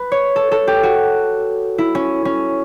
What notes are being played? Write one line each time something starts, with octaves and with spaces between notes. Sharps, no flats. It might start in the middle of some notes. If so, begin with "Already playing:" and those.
Already playing: B4
C#5
A4
A4
G4
F#4
E4
C#4
C#4